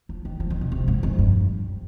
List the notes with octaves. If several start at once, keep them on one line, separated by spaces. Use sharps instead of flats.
F3
D#3
F3
D#3
C3
C3
G#2
F2
G2